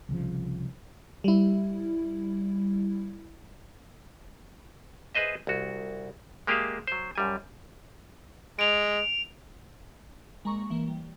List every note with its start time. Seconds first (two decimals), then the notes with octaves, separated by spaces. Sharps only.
0.09 C2 C#3 F3
1.24 G3 E4
5.15 G#4 B4 C5 D#5 E5
5.47 C2 F#4
6.47 G#3 A#3 G4 G#4 E5 F5
6.87 F#3 C5
7.15 F#2 G3 G#5
8.59 G#3 D7 F7
10.44 C2 G#3 A#3 A#5 C#6
10.70 E3 A#3
10.87 G3